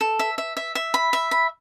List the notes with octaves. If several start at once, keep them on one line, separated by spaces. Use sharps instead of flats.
A4
E5
E5
E5
E5
B5
E5
B5